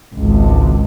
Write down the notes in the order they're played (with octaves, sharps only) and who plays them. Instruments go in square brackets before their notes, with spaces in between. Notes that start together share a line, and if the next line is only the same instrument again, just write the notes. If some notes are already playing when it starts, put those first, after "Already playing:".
[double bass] G#1 C#2